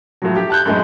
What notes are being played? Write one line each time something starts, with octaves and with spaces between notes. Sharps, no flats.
A2 F3 F#3
G4
A5 F#6 G6
F#2 A2 G#3